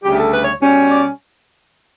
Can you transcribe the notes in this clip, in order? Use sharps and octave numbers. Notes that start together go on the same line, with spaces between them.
D2 C#3 G3 G4
A4
B4
C#5
B2 G3 C#4
D5